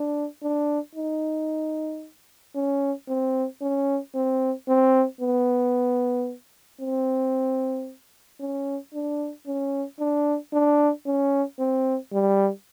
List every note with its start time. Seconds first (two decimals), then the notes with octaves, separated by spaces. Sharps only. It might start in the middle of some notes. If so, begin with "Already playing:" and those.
Already playing: D4
0.42 D4
0.96 D#4
2.55 C#4
3.08 C4
3.61 C#4
4.14 C4
4.68 C4
5.21 B3
6.81 C4
8.40 C#4
8.94 D4
9.47 C#4
10.00 D4
10.53 D4
11.06 C#4
11.59 C4
12.12 G3